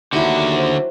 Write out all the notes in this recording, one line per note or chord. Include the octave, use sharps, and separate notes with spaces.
D#2 D3 F#3 E4 F#4 G4
C5